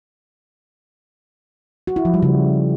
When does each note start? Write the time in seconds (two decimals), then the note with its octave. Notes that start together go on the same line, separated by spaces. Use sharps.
1.87 F#4
1.96 E4
2.05 F3
2.14 G3
2.23 C#3